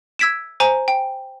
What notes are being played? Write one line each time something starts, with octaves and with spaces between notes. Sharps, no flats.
E6 G#6 B6 D7 E7
C5 G#5 A#5
G5